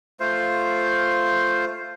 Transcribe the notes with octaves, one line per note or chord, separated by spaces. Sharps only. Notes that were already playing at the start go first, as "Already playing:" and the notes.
A3 F4 C5 F5